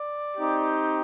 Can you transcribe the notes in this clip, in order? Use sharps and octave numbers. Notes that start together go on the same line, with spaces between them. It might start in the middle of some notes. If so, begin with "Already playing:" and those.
Already playing: D5
C4 D#4 G4